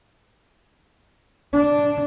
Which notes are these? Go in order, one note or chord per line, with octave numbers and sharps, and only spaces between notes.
D4